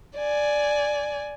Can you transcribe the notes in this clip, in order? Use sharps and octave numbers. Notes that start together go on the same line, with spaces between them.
D5 G#5